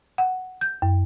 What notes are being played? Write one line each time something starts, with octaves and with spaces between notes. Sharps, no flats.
F#5
G6
F#2